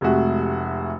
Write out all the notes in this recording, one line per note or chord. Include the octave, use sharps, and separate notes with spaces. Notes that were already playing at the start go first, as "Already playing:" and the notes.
F1 C3 G#3 A3 F#4